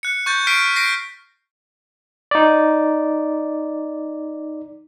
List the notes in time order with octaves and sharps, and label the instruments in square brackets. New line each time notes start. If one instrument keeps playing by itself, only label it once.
[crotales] F#6 C#7
C#6 F#6 G6 A6
C#6 F6 B6 C7 D7
A#6 C7 D7
[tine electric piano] D#4 D5